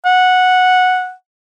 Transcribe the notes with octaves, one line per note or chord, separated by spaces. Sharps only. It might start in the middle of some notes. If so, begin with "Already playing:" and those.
F#5